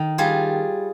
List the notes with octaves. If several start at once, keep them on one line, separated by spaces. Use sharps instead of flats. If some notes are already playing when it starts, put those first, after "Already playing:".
Already playing: D#3
G3 F4 G#4